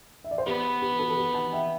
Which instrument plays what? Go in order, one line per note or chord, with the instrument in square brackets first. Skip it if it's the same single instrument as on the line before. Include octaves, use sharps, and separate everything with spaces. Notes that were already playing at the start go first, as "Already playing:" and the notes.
[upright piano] E5
D5
C5
[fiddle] B3 [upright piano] G4 B4
[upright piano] G4
F#4 A4
A4
G4 B4
F#5 A5
E5 G5